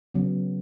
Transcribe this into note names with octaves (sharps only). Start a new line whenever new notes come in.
C#3 F#3 B3